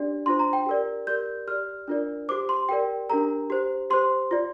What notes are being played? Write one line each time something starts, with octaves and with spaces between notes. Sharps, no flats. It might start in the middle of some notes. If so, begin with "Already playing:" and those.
Already playing: D4 G4 D5
D4 F4 C5 C6
A#5
G5
G4 A#4 D5
G4 A#4 D5 G6
G4 D5 F6
D4 F4 A#4 D5
G4 C5 D6
C6
G4 A#4 D5 G5
D4 G4 A#4 A#5
G4 C5
G4 C5 C6
F4 D5